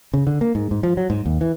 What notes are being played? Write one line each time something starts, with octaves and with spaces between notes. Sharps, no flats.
C#3
D3
A#3
G#2
G#2
F3
F#3
G#2
D#2
E3